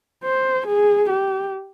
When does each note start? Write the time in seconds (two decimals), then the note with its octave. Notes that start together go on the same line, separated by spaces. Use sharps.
0.23 C5
0.67 G#4
1.10 G4